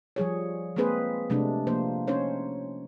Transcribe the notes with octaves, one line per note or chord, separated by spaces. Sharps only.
F3 G3 G#4 C#5
G#3 A#3 C4 G#4 B4 C5
C3 G#3 A3 D4 G4
F3 A#3 C5
C#4 D#4 C5 C#5